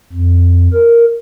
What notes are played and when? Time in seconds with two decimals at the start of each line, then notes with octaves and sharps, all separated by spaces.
0.12 F2
0.73 A#4